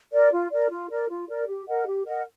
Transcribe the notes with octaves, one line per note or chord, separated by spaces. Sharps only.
A#4 D5
F4
A#4 D5
F4
A#4 D5
F4
A#4 D5
G4
A#4 D#5 F#5
G4
A#4 D#5 F#5